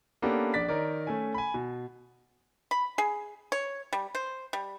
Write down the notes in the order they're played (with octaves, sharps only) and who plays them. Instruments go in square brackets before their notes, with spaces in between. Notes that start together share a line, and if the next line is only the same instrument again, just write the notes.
[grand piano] A#3 B3 C#4 D4 G4 A4
A#1 D4 D5 A6 B6
D#3 D#4 A#4 C#5 D5
A3 C#4 G#5
G#5 B5
B2
[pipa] B5
G#4
C#5
G3
C5
G3